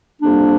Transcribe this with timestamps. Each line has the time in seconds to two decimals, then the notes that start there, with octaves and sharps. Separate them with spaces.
0.21 F2 C3 G3 A#3 D4